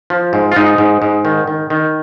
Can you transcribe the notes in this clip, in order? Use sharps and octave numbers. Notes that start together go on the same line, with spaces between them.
F3
G#2
F4
G#2 D#4
G#2
G#2
D#3
D#3
D#3